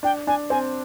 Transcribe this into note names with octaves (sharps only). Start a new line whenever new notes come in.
D4 G5
D4 G#5
C4 G#5